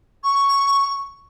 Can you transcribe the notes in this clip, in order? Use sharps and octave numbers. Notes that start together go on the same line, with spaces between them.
C#6